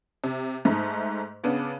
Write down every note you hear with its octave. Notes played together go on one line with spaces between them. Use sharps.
C3
G#2 A3 D#4
C#3 B3 D4